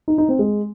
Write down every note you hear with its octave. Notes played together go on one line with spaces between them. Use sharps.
D#4
D#4
C4
G#3